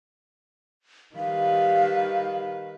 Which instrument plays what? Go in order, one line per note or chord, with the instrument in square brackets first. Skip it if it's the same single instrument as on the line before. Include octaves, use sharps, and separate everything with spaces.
[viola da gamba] D#3 G3 B4 [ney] F5